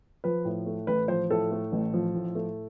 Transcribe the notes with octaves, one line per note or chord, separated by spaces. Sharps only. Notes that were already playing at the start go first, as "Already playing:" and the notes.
F3 B4
A2
A3
A1 B4
F3 C5
A2 A4
A3
A1
F3
A2
A3